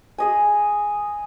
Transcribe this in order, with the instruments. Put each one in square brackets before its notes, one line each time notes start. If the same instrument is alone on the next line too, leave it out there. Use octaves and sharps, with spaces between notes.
[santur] G#4 D#5 G#5